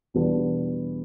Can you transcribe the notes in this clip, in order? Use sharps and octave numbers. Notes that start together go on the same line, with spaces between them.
E2 B2 G3 B3 D4